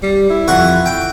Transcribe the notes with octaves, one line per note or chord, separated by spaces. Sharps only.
G3
E4
F2 F#5 C#6
G5